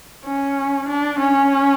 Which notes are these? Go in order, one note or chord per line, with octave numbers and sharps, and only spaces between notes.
C#4
D4
C#4